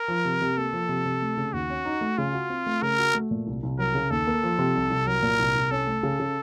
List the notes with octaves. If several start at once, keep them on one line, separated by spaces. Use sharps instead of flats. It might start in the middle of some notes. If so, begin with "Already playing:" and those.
Already playing: A#4
F3
C3
C3
A#3 A4
F3
C3
C3
A3
C#3
D#2 F#4
C#4
D#4
A3
C#3 F4
F#4
C4
A3
C#3 A#4
F#4
A3
A#2
C2
C2
F#3 A#4
C#3
D#2 A4
A#3
F3
C3
C2
C2
F#3 A#4
A#2
C2
C2
C#4 A4
A3
C#3
C#3